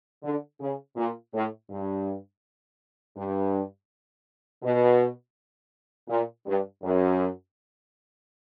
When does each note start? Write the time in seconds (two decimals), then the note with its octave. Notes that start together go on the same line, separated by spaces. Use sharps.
0.23 D3
0.61 C#3
0.96 A#2
1.33 A2
1.70 G2
3.16 G2
4.63 B2
6.08 A#2
6.46 G2
6.82 F#2